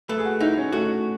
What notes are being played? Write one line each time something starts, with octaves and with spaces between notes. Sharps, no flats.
A3 B4
G#4
F#4
D#4 E4
C#4
A3 F#4